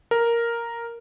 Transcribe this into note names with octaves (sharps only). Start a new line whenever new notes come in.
A#4